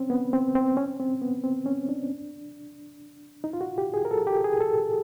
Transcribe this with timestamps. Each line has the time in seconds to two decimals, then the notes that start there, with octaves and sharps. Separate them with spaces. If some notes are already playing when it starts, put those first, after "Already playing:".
Already playing: C4 C#4
0.10 B3
0.33 C4
0.55 C4
0.77 C#4
0.99 C4
1.22 B3
1.44 C4
1.66 C#4
1.89 D4
3.44 D#4
3.53 F4
3.61 F#4
3.78 G4
3.94 G#4
4.05 A#4
4.11 A4
4.27 G4
4.44 G#4
4.61 A4